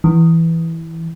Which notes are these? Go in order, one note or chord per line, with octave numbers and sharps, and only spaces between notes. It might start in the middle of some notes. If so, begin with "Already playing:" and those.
E3